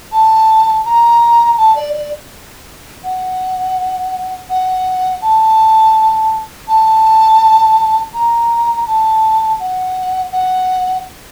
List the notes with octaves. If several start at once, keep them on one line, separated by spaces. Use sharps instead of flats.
A5
A#5
A5
D5
D5
F#5
F#5
A5
A5
A#5
A5
F#5
F#5